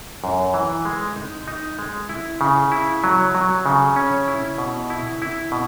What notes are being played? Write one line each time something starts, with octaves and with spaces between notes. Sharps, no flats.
F#2
E3
G#3
D#4
D#4
G#3
E4
C#3
E4
F#3
F#3
C#3
C#4
E4
B2
E4
E4
B2